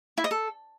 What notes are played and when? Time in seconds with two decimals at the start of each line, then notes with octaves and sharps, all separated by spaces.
0.18 E4
0.24 D#5
0.31 A4